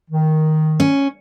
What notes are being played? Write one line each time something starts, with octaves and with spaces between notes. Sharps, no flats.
D#3
C#4